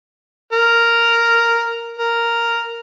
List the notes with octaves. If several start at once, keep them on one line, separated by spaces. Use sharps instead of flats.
A#4
A#4